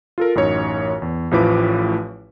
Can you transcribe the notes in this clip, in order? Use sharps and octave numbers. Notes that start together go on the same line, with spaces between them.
F4 A4 A#4
A1 F#2 D#4 C#5
E2
A1 A2 F3 E4 B4 D6